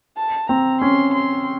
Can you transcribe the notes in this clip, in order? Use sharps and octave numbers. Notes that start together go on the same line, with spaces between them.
A5
C4 A#5
C#4 C6
C6